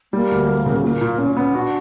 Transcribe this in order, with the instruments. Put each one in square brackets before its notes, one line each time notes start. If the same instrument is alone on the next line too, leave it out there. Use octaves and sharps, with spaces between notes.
[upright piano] G3 [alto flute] A#3
[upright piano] D2
G3
C#3
[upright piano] A#2 [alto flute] A#3
[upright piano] A#2
[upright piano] A#2 [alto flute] C#4
[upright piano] B3 [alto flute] C#4
[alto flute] D4 [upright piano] F#4